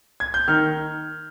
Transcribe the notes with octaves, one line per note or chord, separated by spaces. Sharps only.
G#6
G6
D#3 F6